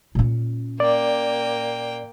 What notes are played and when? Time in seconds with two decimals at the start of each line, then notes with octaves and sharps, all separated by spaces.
0.15 A#2 C#4
0.80 A#3 D5 G5